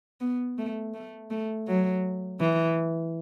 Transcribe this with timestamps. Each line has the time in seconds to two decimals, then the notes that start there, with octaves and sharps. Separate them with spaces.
0.21 B3
0.58 A3
0.94 A3
1.30 A3
1.68 F#3
2.40 E3